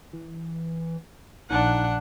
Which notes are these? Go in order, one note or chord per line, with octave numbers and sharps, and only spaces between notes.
E3
A#1 D4 D#4 F#5